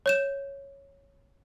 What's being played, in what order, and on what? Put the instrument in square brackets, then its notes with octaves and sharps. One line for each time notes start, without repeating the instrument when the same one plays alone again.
[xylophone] C#5 G6 E7